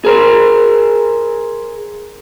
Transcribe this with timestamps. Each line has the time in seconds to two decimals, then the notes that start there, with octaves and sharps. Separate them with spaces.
0.05 G#4 A#4 C5